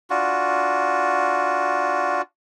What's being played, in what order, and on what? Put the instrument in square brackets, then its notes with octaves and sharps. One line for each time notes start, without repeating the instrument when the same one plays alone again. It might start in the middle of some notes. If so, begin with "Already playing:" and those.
[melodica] D4 F4 F#4